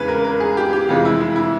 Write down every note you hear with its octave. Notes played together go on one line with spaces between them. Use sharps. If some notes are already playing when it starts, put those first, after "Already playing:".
Already playing: E2 C#3 E3 G#3 B3 B4
A#4
A#4
G#4
G4
G4
F2 C3 E3 G#3 F4
E4
E4
E4